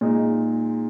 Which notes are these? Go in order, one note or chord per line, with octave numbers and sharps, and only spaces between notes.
A#2 G#3 D#4